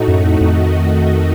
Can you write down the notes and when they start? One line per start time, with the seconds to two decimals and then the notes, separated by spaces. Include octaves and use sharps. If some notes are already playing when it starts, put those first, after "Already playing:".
Already playing: A2 A3 D#4 F#4
0.08 F#2
0.25 F2
0.41 F2 D#3 A3 D#4 F#4